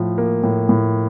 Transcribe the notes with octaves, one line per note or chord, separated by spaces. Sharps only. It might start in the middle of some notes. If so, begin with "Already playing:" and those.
Already playing: A2 F3
A#3
A2
A2